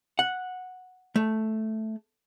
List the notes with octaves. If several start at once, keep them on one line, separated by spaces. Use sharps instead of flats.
F#5
A3